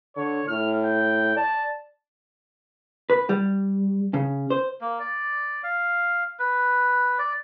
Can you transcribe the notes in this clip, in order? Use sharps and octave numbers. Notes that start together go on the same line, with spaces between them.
D3 C#5
A2 F6
G5
D5 A5
B4
G3
C#3
C5
A#3
D5
F5
B4
D5